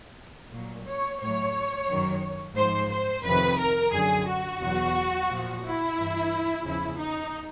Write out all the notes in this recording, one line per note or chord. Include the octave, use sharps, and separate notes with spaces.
A#2 F#3
C#5
A2 F#3 C#5
F#2 D#3 F#3
G#2 F3 C5
C5
F2 C3 D#3 B4
A#4
F#2 D3 F#3 G#4
F#4
E2 B2 F#3
A#2 F3
E4
G2 E3
E2 C#3 F3 E4
D#4